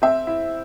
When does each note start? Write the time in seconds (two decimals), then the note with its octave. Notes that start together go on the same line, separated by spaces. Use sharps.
0.02 C4 E5
0.27 E4